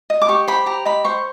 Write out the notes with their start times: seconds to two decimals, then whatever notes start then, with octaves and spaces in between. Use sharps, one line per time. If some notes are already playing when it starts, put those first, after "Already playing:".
0.10 D#5
0.22 D6
0.28 G4 C#6
0.48 C5 B5
0.66 G4 A#5
0.85 D#5 B5
1.04 C5 C#6